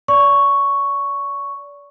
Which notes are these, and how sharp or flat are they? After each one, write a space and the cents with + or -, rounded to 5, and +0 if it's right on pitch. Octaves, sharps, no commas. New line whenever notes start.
D5 -35 C#6 +5